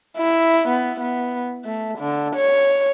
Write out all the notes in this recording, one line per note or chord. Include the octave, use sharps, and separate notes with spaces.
E4
B3
B3
A3
D3
C#5